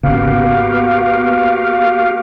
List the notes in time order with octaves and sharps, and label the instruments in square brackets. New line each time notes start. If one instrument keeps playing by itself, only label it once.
[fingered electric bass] G#1 C#3 [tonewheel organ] A#3 F#4 G4 [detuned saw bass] B3 [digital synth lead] F5